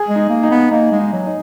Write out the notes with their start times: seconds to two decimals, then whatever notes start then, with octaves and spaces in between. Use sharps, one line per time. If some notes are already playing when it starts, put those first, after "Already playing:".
Already playing: G#4
0.08 G#3
0.16 D#4
0.29 A#3
0.43 D#4
0.50 B3
0.71 A#3 D#4
0.92 G#3
0.99 D#4
1.13 F#3
1.26 D#4